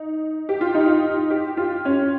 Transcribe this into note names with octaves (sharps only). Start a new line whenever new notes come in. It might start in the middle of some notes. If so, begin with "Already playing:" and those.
Already playing: D#4
G4
F4
D#4
F4
G4
F4
C#4